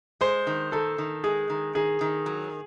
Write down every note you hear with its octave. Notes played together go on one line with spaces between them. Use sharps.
G#3 C5
D#3
D#3 A4
D#3
G#3 G#4
D#3
D#3 G#4
D#3
F#3